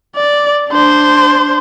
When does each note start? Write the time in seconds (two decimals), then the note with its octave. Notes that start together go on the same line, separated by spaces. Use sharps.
0.16 D5
0.70 D4 C5